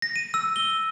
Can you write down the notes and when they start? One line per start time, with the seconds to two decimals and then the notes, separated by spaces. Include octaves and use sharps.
0.02 A#6
0.16 D#7
0.34 E6
0.56 G7